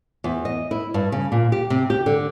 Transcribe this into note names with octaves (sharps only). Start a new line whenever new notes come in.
E2
D#5
E4
G2
C#3
A#2
G4
C3
G4
D3